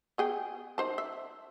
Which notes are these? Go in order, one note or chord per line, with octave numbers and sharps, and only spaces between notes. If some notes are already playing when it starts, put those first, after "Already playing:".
B3 G#4 G5
D#4 C5 A5
E5